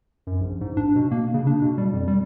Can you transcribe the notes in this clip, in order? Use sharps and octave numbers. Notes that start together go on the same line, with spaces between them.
F#2
A#1
G#2
D4
B2
A#3
C#3
D4
B2
G3
F2
G3